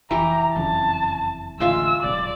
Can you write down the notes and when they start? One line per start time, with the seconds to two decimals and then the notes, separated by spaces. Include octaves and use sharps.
0.11 F1 E3 G4 A#5
0.56 F#1 F2 C#3 A5
1.60 A1 D2 G#3 F4 E5 E6
2.03 D1 B1 D5